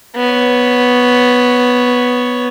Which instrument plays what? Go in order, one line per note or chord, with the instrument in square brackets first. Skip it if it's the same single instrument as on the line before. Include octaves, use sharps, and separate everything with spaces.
[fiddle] B3 C#5